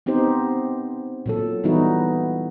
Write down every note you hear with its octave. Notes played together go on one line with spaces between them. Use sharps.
B3 C4 D#4 G4 C5
A#2 F#3 A4
E3 G3 B3 D#4 E4 F#4